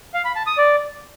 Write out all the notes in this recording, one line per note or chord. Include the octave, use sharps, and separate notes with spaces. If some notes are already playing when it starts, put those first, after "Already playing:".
F5
B5
A5
D#6
D5